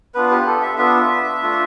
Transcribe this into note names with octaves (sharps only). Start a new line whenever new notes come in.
B3 D4 F4 B4
G4
A4
E5
B3 D4 F4 E5
A3 D4 F4